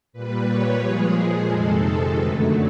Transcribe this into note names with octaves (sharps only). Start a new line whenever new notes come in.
A#2 G3 B4
C#5
A#2 F3 G#3 G#4
F2 C3 D#3 G#3 A4
F#2 D3 F#3 A3 B4